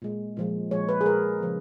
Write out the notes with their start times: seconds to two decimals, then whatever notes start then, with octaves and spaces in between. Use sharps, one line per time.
0.02 A#2 G#3
0.37 A#2 F3 G#3
0.71 A#2 F3 G#3 C#5
0.89 B4
1.01 G#4
1.06 A#2 G#3 A#4
1.41 C#3 F3 A#3